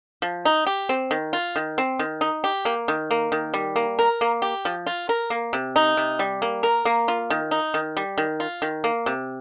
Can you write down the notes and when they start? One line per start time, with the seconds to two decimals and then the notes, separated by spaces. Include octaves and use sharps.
0.22 F3
0.45 D#4
0.67 G4
0.89 C4
1.11 D#3
1.33 F4
1.56 D#3
1.78 C4
1.99 D#3
2.21 D#4
2.44 G4
2.65 A#3
2.88 D#3
3.11 A#3
3.32 D#3
3.54 G3
3.76 A#3
3.99 A#4
4.21 A#3
4.42 G4
4.65 F3
4.87 F4
5.09 A#4
5.30 A#3
5.53 C3
5.76 D#4
5.97 C3
6.19 G3
6.42 A#3
6.63 A#4
6.85 A#3
7.08 F4
7.30 D#3
7.51 D#4
7.74 D#3
7.97 G3
8.18 D#3
8.40 F4
8.62 D#3
8.84 A#3
9.06 C3